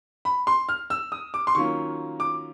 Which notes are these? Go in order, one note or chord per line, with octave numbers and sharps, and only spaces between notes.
B5
C6
F6
E6
D#6
D6
C6
D#3 F#3 A#3 C#4 F4 C#6
D6